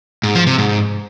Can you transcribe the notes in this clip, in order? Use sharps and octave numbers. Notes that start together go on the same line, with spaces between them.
G#2
F3
C3
G#2